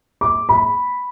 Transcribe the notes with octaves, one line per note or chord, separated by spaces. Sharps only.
D6
B5